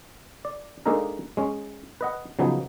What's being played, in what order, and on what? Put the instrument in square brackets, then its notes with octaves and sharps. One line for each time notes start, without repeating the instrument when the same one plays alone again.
[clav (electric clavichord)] D5
G#3 A#3 D4 D#4 A4 A#4
G#3 C#4
B4 D#5 F#5
C#3 F3 F#3 B3 D#4